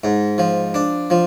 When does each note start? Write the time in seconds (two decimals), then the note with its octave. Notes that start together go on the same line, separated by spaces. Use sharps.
0.04 G#2
0.38 F3
0.74 D4
1.10 F3